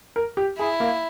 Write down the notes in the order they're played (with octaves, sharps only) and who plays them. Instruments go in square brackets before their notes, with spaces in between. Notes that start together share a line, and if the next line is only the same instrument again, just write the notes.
[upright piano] A#4
G4
[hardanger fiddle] E4 [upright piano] G#4
[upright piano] A#3